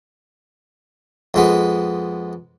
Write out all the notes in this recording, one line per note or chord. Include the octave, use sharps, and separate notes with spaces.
F2 G#3 B3